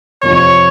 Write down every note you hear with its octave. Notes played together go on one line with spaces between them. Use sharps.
F2 C3 F3 C#5